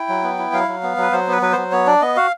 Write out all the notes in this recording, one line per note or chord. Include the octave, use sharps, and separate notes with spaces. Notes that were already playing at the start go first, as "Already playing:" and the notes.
Already playing: E4 G5
F#3
B3
E4
F#3 F5
F#3
B3
F#3 B4
F#3 C5
B3 B4
F#3 B4
F#3 C5
B3 C#5
D4 D5
B3 D#5
F#4 F5